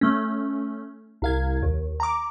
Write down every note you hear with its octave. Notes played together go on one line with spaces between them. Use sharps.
A3 C#4
C2 F5 G#6
D#2
A#5 D6